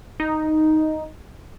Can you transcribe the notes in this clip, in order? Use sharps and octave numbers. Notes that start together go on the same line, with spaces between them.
D#4